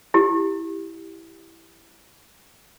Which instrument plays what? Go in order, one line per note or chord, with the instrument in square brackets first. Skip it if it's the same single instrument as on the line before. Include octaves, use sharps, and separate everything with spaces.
[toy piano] E4 G4